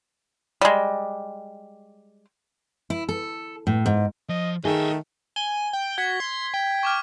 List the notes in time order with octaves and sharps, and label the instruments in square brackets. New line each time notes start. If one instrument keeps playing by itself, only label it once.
[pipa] G3 G#3
[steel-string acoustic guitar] E4
A4
A2
G#2
[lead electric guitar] F3 [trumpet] D#5
[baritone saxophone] D#3 [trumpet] A3 [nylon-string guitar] G#4 [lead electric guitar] D#5 E5
[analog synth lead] G#5 [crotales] G7
[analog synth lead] G5
[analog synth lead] F#4 [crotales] G#6 B6
[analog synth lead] C6
G5
[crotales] C#6 D6 F6